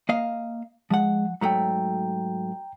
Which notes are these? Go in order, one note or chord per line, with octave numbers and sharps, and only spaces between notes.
A#3 D#5 F5
F3 G#3 F#5
G#2 F#3 A3 G5 A#5